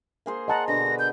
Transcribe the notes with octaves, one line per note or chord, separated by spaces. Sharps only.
A#3 G#4 C5
D#5 F#5 A5 A#5
B2 D3 D5 A#6
B4 F#5
G6